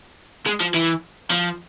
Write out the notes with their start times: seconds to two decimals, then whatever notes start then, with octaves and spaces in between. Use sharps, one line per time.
0.47 G#3
0.61 F3
0.74 E3
1.31 F3